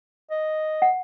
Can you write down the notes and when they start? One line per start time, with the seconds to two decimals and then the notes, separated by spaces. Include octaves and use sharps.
0.30 D#5
0.82 F#5